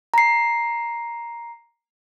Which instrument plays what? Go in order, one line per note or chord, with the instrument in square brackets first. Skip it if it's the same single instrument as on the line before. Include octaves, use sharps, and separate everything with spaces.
[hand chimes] A#5 C7